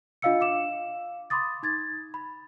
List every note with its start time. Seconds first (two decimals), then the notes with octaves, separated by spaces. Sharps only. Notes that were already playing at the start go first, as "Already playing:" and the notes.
0.22 D4 F4 D#5 F5 E6 C#7
0.41 F5 D6 E7
1.30 B5 C6 D6 D#6 A6
1.63 D#4 G#6 A6
2.14 B5